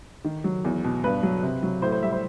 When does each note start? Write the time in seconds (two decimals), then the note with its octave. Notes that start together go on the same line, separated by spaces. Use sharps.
0.25 D#3
0.44 F#3
0.65 E2
0.84 B2
1.04 G2 B4
1.23 F#3
1.43 C3
1.63 F#3
1.82 A2 C5
1.92 C5
2.02 G3 E5
2.12 C5